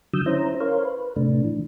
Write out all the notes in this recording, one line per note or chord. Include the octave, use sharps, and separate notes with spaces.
D3 F#3 D#6 E6 G6
C#4 E4 C5 A#5
A#4 C5 C#5 F5
B4
A2 C3 A3 D4
E3